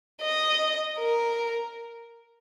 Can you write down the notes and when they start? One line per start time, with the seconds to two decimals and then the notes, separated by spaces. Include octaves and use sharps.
0.22 D#5
0.99 A#4